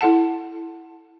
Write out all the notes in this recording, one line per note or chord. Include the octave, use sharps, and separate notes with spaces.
E4 A4 F#5 A5